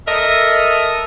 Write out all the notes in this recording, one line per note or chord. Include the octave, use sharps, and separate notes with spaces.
A4 A#4 D#5 E5